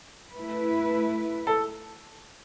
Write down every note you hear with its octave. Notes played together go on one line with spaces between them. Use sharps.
A3 E4 B4
A4